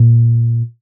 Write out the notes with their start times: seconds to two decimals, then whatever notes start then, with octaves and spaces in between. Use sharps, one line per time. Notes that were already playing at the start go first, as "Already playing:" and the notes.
Already playing: A#2